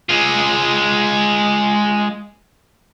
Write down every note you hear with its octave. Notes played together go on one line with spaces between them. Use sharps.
G#3 F4